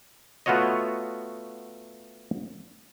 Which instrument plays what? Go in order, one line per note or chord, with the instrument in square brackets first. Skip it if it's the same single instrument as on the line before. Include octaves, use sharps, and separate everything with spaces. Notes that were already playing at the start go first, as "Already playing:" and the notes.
[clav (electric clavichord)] A3 B3 F4 F#4 C#5 D#5